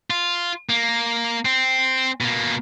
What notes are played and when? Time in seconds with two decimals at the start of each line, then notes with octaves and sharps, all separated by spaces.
0.10 F4
0.69 A#3
1.45 C4
2.21 B2 A#3